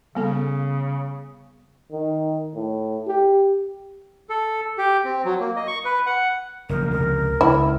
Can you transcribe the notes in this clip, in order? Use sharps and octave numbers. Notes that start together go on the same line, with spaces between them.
C#3 G3 B3 A4
D#3
A2
G4
A4
G4
C4
F#3
A#3
D#5
C#6
B4
F#5
F#1 C3 F3 A#4
C#2 C3 F3 A#4
C#2 E4